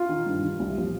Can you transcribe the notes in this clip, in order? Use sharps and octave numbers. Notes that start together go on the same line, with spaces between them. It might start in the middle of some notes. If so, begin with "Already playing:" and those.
Already playing: F4
D#3
G2
D#3
C2
A#2 F3